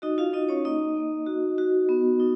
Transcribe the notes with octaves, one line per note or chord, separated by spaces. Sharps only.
D#4 F#4 D#5
F4 F5
D#4 D#5
C#4 C#5
A#3 D#4 D#5
A#3
F#4
F#4
B3
D#4